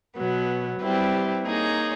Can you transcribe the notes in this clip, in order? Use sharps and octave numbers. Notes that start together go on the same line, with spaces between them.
B2 F#3 B3
G3 C4 E4 G4 B4
A#3 D#4 G#4 C#5